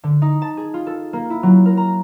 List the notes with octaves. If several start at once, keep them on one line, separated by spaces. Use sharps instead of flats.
D3
D#4
A5
G#4
F4
A4
A#3
E4
F#3
A#4
A#5